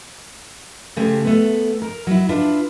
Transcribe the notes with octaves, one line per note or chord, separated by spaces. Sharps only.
C#3 A3 G4 C5
A3 B3
A#4
F#3 E4
D4 E4 F4 B4